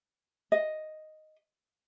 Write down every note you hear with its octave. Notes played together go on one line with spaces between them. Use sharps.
D#5